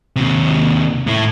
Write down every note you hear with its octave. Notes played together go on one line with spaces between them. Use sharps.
D#2 C3
A2 E4